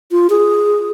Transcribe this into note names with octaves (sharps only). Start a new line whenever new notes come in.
F4
G#4